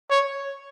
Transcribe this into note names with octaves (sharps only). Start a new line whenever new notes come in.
C#5